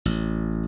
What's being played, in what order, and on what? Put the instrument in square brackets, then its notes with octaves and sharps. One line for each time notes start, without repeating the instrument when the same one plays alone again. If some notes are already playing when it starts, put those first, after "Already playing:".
[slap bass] A1